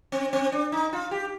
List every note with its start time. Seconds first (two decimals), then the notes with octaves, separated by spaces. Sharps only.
0.12 C4
0.33 C4
0.52 D4
0.72 D#4
0.93 F4
1.11 G4